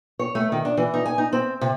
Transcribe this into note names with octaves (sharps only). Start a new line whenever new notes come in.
C#5
A3
D#3
D4
E3
D#4
G#5
D#4
C4
C3